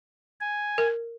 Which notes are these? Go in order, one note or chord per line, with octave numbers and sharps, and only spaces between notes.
G#5
A#4